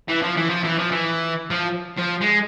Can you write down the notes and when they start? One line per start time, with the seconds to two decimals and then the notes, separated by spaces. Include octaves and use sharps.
0.09 E3
0.22 F3
0.37 E3
0.50 F3
0.64 E3
0.79 F3
0.92 E3
1.50 F3
1.98 F3
2.21 G#3